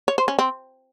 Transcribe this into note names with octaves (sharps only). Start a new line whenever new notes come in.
C#5
C5
C#4
C4